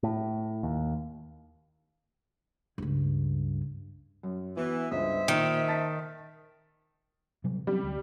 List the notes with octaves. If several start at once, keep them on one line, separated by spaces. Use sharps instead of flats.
A2
D#2
C#2 G2
F#2
E3 B3 F#4
C#2 G2 C5 D#5 E5
A#2 D#3
A5 A6 B6
C3 F#3 G3
F#3 G3 C4 C#4
D2